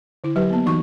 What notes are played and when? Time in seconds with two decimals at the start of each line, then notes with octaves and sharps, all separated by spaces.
0.24 D3 E4
0.36 F#3 G4 B4
0.50 A#3 B3
0.66 E3 D#4 F#4 C#6